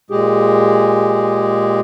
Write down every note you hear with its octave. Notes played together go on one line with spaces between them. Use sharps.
A#2 G#3 G4 G#4